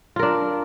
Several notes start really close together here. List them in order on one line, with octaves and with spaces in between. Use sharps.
F4 A#4 D4